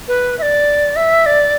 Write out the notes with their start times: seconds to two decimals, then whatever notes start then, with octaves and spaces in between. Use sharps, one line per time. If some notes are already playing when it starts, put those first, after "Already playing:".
0.08 B4
0.38 E5
0.42 D5
0.96 E5
1.26 D5